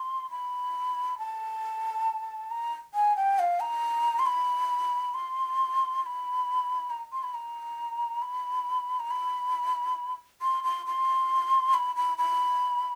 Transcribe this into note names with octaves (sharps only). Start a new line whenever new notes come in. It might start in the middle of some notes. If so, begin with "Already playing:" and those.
Already playing: C6
B5
A5
A#5
G#5
G5
F5
A#5
C6
B5
C6
C6
B5
A#5
C6
B5
A#5
B5
A#5
B5
C6
C6
C6
B5
B5
B5